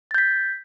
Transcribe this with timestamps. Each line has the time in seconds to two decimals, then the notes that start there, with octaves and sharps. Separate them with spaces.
0.11 A6
0.14 G6
0.18 B6